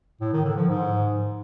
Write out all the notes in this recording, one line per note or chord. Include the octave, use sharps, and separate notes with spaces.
A2
D#3
D3
F3
G#2